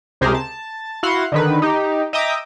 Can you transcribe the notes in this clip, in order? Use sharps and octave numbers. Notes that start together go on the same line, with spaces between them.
C#2 C3 G4 G#4 A#4 C5
A5
E4 F#4 F5 F#5 C6
D3 D#3 B4
D#4 G4
D#5 E5 G5 A#5 D6 D#6